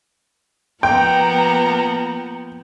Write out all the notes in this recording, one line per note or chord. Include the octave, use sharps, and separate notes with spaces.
F3 A#3 B3 G5 A#5